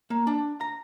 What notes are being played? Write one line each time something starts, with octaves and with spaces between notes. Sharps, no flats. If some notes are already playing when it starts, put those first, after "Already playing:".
A#3
D4
A#5